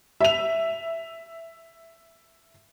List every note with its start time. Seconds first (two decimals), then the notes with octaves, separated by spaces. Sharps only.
0.21 E5 F7